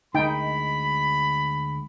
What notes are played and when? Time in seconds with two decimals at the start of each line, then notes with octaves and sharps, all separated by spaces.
0.15 D2 G#3 D#4 G5 B5